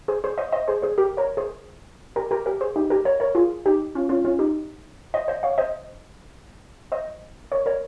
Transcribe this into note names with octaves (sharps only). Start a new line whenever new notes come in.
G#4 C5
G#4 C5
C5 D#5
C5 D#5
G#4 C5
G#4 C5
G4 A#4
A#4 C#5
G#4 C5
G4 A#4
G4 A#4
G4 A#4
G#4 C5
D#4 G4
G4 A#4
A#4 C#5
A#4 C#5
F4 G#4
D#4 G4
C#4 F4
C#4 F4
C#4 F4
D#4 G4
C5 D#5
C5 D#5
C#5 F5
C5 D#5
C5 D#5
A#4 C#5
A#4 C#5